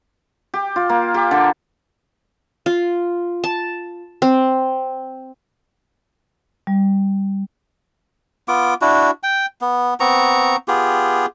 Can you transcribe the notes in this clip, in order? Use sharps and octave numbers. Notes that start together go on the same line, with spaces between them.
G4
F4
A#3
G4
D3
F4
A5
C4
G3
B3 F4 D6
D4 E4 F#4
G5
B3
B3 C4 A#5 C#6
B3 F4 G4 G#4